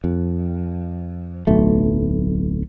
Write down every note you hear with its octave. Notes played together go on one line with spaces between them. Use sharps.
F2
D1 B1 A3